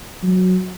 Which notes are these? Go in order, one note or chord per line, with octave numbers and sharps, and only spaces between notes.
F#3